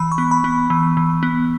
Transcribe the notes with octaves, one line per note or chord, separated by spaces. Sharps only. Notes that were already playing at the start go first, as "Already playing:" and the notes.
Already playing: E3 B5
C#6
B3
B5
B3
E3
E3
B3